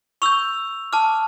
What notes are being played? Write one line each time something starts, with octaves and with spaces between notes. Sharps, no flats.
C#6 E6 G6 F7
A5 D6 F6